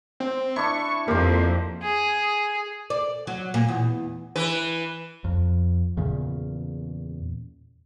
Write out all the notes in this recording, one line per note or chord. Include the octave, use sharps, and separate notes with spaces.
C4
D4 E4 C#6
F2 A#3 G4 C5
G#4
D5
F#3
A#2
E2
E3 B4
F2
E2 A#2 C#3